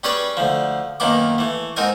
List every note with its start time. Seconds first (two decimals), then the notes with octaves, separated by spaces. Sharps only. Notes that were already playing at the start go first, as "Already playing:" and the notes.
0.04 G3 C#4 G#4 B4 C#5 D5
0.37 D2 F3
1.00 F#2 D#3 A#3 B3 D6
1.38 E3 A3
1.76 G#2 C4 D#4 A#4 G#5